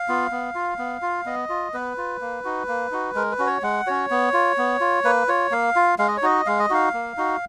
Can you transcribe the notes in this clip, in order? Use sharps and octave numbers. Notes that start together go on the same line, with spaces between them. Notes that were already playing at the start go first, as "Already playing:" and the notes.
Already playing: F5
B3 F4
B3
F4
B3
F4
B3 D#5
F4
B3 B4
F4
A#3
D#4 F#4
A#3
D#4 F#4
G#3 A#4
B4
C#4 F#4
C#5
G#3 F#5
C#4 F#4 C#5
B3
F4
B3
F4
A#3 B4
F4 C#5
A#3 F5
F4
G#3 F5
D#5
C#5
D#4 F#4 D#5
G#3 F5
D#5
D#4 F#4 F5
A#3
D#4 F#4